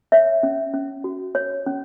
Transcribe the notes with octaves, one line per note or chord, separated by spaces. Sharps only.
C#5 E5
C#4
C#4
F#4
C#5
C#4